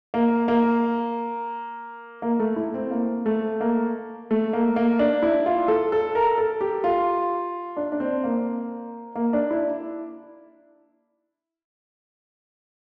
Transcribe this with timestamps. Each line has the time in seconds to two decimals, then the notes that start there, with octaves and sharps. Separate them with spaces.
0.14 A#3
0.48 A#3
2.22 A#3
2.40 A3
2.56 E4
2.74 C4
2.91 A#3
3.26 A3
3.61 A#3
4.31 A3
4.53 A#3
4.76 A#3
4.99 D4
5.22 E4
5.46 F4
5.68 A4
5.92 A4
6.15 A#4
6.38 A4
6.61 G4
6.84 F4
7.77 D4
7.92 D4
8.00 C4
8.24 A#3
9.16 A#3
9.33 D4
9.51 E4